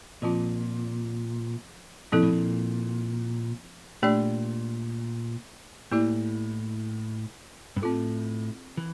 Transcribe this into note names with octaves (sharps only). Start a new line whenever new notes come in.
A#2 F3 C4 F4
A#2 F3 C4 E4 A4
A2
A#2
A#2 A3 D4 G4 D5
A2 A#3 E4 G4 D5
G2
A2 C4 F4 A4
E3